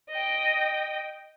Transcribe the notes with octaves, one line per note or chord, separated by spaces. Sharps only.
D#5 G5